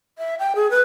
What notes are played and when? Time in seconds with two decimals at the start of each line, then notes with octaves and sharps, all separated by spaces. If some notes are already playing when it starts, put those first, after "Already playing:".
0.18 E5
0.39 G5
0.55 G#4
0.71 B4